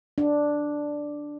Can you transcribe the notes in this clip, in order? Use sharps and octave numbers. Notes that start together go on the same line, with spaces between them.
D4